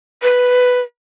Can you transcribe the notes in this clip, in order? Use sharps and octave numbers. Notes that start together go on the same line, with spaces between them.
B4